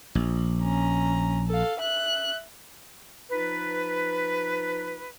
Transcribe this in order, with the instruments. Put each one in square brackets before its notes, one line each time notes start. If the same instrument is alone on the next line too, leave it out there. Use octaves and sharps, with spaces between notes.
[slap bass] A#1
[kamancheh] C#4 A#5
A4 F5
E5 F#6
[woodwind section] F3 D#4 F4 B4